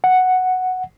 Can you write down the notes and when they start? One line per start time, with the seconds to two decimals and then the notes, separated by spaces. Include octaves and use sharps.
0.04 F#5